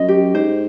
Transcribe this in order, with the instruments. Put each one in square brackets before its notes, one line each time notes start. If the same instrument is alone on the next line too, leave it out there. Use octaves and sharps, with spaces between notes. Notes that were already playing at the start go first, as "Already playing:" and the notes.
Already playing: [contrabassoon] F#2 [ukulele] D#5
[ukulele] G4
[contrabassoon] G#2 [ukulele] C5